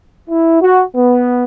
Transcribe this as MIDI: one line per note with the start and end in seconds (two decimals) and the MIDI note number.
0.29 0.61 64
0.61 0.82 66
0.95 1.43 59